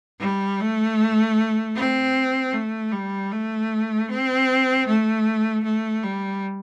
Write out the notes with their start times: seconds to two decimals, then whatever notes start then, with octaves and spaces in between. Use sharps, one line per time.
0.20 G3
0.60 A3
1.76 C4
2.53 A3
2.92 G3
3.31 A3
4.09 C4
4.87 A3
5.64 A3
6.03 G3